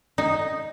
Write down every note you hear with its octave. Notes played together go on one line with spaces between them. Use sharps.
D#4